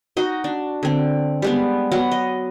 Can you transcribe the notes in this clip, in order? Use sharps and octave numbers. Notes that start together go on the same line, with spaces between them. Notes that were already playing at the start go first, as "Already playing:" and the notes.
D#4 F#4 D#5
D4
D3 C4
G3 G#3 B3
F#3 B3 F#5
D#5